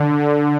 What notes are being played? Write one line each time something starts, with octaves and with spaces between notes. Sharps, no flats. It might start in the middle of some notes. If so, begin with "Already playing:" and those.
Already playing: D3
D3